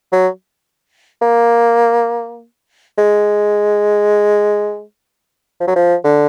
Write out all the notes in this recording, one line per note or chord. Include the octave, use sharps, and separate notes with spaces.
F#3
A#3
G#3
F3
F#3
F3
D3